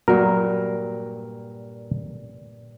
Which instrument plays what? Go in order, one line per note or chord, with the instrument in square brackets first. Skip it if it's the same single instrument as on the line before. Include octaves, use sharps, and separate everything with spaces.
[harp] G2 A#2 [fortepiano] F#3 [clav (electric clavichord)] A#4